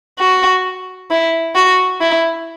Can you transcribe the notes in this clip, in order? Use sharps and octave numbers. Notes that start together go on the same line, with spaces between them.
F#4
E4
F#4
E4